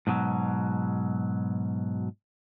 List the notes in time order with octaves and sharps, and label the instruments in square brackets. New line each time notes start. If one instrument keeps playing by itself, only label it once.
[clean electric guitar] G#2 B2 F3 F#3